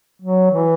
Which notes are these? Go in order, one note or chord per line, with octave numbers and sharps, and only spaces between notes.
F#3
E3